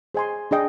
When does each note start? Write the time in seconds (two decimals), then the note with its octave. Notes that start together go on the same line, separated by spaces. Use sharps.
0.15 G#4 C5 D#5 G#5 C6
0.51 D4 G#4 D#5 G5